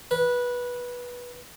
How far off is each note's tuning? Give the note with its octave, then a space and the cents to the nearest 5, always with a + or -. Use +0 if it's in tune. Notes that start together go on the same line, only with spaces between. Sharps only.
B4 -15